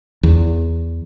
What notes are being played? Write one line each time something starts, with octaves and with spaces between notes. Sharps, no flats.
E2